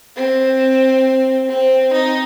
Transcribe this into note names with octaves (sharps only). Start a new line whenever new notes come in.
C4
C4
D#4